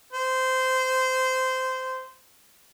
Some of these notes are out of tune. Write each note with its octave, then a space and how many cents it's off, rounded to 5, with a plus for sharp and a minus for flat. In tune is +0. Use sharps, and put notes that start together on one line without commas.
C5 -15